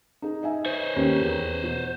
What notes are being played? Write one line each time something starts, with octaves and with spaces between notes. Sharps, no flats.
D#4 G#4
D#5 E5 G#5
C5 C#5 D#5
D#2 C#4 A#4
E2
B2